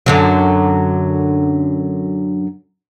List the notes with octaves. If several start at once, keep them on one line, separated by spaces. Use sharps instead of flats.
F#2 D3 F#3